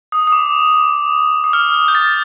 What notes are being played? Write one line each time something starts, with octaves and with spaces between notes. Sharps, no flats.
D#6
D#6
D6
D#6
F6
F6
G6
A6